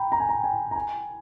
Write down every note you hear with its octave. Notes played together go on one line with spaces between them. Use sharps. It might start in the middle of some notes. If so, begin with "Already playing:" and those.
Already playing: G5 A#5 B5
A#5
G#5
A#5
G#5
A#5
G#5